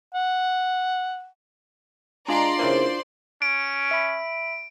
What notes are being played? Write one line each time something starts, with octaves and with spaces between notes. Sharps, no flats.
F#5
G#3 D4 F4 D5 A#5 C6
C#3 E3 A#3 C5
C#4 D7
E5 B5